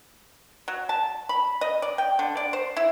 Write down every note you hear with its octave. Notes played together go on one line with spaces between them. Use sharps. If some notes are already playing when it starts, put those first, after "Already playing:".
F#3
A5
B5
D#5
D5
G5
D3
D5
C5
E4